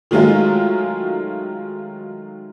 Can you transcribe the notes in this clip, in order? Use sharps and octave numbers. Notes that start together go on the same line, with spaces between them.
D#3 F#3 G#3 A3 F4